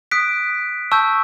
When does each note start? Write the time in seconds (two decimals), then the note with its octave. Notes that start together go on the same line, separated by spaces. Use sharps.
0.11 D#6 F#6 B6 D7
0.92 A5 C#6 E6 G6